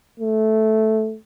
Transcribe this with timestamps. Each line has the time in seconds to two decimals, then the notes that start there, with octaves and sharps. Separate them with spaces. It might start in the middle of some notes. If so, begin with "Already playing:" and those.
0.20 A3